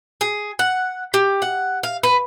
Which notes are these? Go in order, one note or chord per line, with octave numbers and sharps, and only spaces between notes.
G#4
F#5
G4
F#5
F5
B4